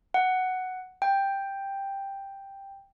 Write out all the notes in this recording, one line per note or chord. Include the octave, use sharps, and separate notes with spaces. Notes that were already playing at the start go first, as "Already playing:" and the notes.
F#5
G5